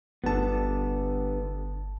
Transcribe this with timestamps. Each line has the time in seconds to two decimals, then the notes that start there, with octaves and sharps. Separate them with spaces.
0.24 G1 D3 G3 B3 A5